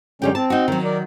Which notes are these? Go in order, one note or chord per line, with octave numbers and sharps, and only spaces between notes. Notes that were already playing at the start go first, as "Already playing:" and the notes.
F#2 D3 G#3 C#4 G4 G5
C4 A5
D#4 F#4
D#3 F#3
A#4 D5